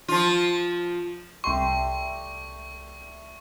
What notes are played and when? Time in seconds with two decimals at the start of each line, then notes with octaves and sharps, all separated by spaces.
0.08 F3 F4
1.44 C2 G3 A3 E5 C6 C#6